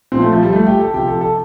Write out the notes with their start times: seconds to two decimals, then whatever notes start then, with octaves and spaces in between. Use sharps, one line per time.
0.12 A#2 F3 C4
0.22 A3
0.33 F3
0.43 G3
0.53 A3
0.67 G4
0.80 A4
0.94 C3 F3 G4
1.08 A4
1.21 A4